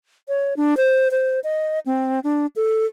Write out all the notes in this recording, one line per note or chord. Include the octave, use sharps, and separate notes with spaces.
C#5
D4
C5
C5
D#5
C4
D4
A4